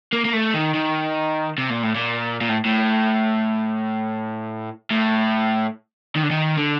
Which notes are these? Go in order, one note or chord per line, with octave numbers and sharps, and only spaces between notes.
A#3
A#3
A3
D#3
D#3
C3
A#2
A2
A#2
A#2
A2
A2
A2
D#3
D3
D#3
D3